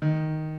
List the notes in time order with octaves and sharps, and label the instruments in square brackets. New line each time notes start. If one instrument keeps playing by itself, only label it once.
[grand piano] D#3